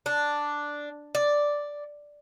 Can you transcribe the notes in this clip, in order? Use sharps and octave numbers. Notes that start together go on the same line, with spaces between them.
D4
D5